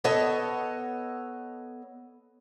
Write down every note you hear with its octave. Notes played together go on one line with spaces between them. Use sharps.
B3 A4 C#5 D#5 A5